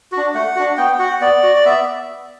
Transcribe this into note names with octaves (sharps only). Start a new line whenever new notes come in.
D4 F#4
A3 F#5
D4 F#4
B3 G5
F#4 F#5
B3 D5
F#4
D5
B3 E5